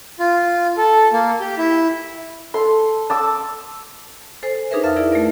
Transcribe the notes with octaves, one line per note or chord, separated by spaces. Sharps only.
F4
A4
A#3
G4
E4
A4 C6
A5 D6 E6
A4 C5 G#5
D4 D#4 G#4 A#4 B4 E5
F2 E5 F5 F6 A6
E4 G#4 A#4 D5
A3 F4 A#4 D5